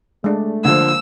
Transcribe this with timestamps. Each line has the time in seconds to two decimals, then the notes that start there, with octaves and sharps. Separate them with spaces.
0.24 G#3 A3 D4
0.65 D3 F3 A#3 E6